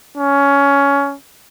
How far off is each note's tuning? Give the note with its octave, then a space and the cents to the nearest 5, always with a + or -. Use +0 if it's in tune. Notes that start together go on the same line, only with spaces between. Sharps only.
C#4 +15